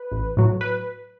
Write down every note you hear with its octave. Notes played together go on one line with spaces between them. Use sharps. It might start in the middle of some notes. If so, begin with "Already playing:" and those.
Already playing: B4
A1
A2 F#3
B4